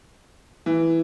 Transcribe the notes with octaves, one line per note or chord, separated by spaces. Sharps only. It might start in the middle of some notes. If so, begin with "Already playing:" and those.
E3